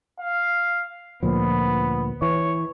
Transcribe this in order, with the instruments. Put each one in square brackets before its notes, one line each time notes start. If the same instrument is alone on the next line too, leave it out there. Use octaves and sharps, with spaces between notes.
[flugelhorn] F5
[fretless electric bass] D2 A#2 F3 [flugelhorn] B3
[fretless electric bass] E3 [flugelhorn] C#5